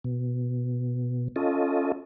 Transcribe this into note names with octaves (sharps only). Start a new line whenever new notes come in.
B2
C#4 F4 A4 D#5